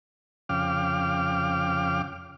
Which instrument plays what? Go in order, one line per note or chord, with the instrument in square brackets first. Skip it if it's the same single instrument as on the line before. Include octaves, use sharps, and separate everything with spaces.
[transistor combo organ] F2 C#3 F5 G5 D6 F6